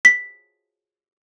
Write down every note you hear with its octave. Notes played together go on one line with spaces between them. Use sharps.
B6